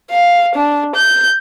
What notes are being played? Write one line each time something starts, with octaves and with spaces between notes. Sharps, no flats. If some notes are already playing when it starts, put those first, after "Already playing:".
F5
D4
G6